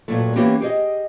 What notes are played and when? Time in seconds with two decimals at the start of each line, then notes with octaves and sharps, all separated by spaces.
0.08 G2 A#2 F3 F#3 A3
0.36 E3 A#3 B3 C#4 G4
0.60 G4 G#4 C#5 D#5